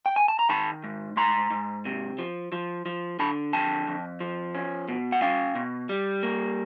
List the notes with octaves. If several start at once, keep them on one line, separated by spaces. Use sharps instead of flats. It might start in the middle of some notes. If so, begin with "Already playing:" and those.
G5
G#5
A5
A#5
D#3 A5 B5
G#2
G#2 A#5 C6
G#2
C3
F3
F3
F3
D3 A5 B5
F2 G5 A5
F2
F3
C#4
B2
F#5
C#4 F5 G5
B2
G3
A#3